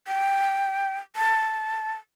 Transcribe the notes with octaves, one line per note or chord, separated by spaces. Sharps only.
G5
A5